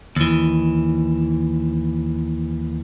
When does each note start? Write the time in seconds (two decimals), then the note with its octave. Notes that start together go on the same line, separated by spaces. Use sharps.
0.16 D#2 E3